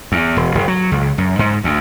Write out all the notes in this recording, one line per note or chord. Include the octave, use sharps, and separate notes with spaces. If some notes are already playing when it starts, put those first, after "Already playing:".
E2
E1
F#1
F#3
C#2
F#2
G#2
D2